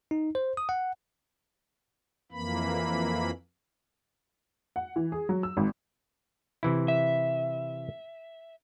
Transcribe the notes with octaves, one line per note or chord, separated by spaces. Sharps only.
D#4
C5
D#6
F#5
F2 E3 A#3 B5
F#5
E3
G#4
F#3
E6
G#1
C3 E3 E4
E5